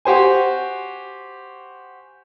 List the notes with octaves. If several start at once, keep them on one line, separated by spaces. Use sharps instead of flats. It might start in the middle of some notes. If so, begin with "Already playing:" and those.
F#4 G4 C5 G#5